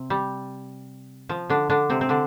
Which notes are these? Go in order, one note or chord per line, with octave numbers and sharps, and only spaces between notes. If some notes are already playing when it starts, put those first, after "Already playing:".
Already playing: C3 C4
G3
F3
D3 D4
D3 D4
C3 C4
C4
D3 D4